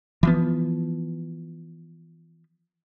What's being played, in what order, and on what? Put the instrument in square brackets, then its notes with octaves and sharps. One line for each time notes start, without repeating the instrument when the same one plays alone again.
[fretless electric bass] E3 F3 B3